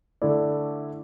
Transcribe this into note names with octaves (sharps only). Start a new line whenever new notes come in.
D3 A3 E4 D5